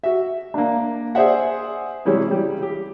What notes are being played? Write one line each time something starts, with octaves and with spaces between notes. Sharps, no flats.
F#4 E5
A#3 D4
G#4 C5 D5 E5 F#5
C3 E3 G3 G#3 C#4
C#3 G3
G4